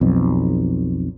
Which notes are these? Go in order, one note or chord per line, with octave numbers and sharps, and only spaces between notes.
B1 F2